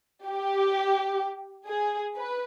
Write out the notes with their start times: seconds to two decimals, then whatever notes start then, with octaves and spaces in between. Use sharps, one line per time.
0.24 G4
1.66 G#4
2.15 B4